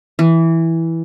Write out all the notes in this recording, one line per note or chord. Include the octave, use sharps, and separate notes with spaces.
E3